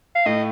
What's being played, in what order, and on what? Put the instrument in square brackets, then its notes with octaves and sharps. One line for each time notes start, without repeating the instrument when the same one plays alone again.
[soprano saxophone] F5
[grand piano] A2 A3 [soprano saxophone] D#5